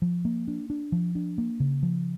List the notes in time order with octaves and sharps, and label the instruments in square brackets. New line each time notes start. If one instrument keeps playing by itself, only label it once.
[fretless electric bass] F3
A#3
D4
D4
F3
D4
A#3
C#3
F3